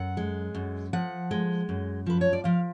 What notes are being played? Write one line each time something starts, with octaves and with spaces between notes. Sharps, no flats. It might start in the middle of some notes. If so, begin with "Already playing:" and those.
Already playing: F#2 F#5
G#3
F#2
F3 F#5
G#3
F#2
F3 B4
C#5
D5
F3 F5